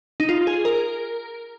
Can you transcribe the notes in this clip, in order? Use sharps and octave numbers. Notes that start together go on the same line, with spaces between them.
D#4
F4
G#4
A#4